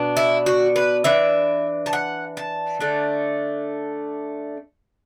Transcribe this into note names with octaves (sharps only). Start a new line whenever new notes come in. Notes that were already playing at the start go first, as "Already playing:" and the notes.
Already playing: B2 B3 D4
E4
F#4
B4
E3 D4 E5
A5
F#5
A5
D3 A3 D4